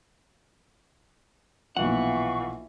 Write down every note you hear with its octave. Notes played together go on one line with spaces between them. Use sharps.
B1 A#2 E3 F3 F5 F#5 C#6